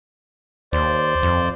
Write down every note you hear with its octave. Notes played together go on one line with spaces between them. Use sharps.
D#2 C5 D5
F2